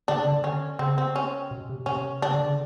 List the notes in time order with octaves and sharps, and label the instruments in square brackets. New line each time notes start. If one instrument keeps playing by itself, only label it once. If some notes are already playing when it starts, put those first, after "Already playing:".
[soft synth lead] D3 [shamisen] D4
[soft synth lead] C#3
D3
[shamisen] C#4
[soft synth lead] C#3 [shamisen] C4
[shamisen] C4
C#4
[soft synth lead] B2
C3
[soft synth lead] C3 [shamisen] C#4
[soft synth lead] C#3 [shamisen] D4
[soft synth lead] D3
C#3